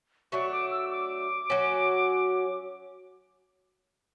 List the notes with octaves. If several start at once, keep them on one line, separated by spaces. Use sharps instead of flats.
F#3 A3 D4 C#6
D6
E6
D6
F#3 C#4 F#4